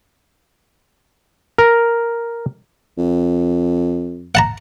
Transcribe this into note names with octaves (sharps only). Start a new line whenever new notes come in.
A#4
F2
F#5 A5 A#5